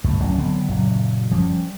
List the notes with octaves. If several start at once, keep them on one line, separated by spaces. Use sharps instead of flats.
C#2 G2 A3
D1 F#3 G3 C#4
D3 F#3 B3 C4
F#1 A#2 F#3
F3 G3 C#4